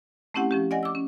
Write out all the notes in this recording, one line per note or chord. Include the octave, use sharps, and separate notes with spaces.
A3 C4 C#4 E4 G4 F#5
F3 C#4 G4
D5 D#5 F#5 G#5 A#6
D6 E6
C#4